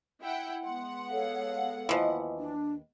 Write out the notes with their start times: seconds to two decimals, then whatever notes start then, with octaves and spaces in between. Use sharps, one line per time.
0.23 E4 F#5 G5
0.64 G#3 B3 F#5 C6
1.11 A4 C#5 F5
1.89 D#2 E3 F3 B4 D#5
2.39 D4